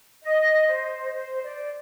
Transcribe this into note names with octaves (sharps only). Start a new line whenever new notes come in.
D#5
C5
C5
D5